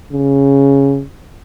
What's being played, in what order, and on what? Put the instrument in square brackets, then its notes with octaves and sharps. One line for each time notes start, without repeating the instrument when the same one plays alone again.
[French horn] C#3